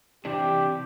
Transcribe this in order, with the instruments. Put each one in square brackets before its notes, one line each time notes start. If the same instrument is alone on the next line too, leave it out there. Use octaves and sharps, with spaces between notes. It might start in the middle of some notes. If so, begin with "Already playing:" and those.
[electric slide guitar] C3 E3 D4 [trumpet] G4